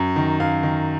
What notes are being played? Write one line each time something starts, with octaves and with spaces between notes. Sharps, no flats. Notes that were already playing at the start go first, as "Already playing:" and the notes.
Already playing: F#2
D#3
F#2 F5
D#3